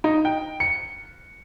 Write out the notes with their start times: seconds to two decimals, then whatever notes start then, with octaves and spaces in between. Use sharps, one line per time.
0.04 D#4
0.25 G5
0.60 C#7